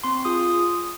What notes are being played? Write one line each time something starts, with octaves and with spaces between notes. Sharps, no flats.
C4 C6
F4 G#4 D#6